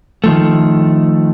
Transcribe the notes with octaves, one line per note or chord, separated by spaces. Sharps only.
D#3 F3 A3